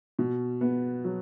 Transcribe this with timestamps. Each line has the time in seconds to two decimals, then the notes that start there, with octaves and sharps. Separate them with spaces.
0.19 B2
0.61 B3
1.04 F#3